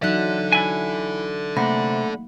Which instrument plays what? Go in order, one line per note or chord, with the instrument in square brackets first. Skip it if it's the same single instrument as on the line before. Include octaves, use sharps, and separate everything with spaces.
[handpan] E3 F#3 D#4 [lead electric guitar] A4 D5 [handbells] E5 F#6
[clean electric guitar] E4 G#5
[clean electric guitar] C3 [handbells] A3 F#5 B5 [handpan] A#3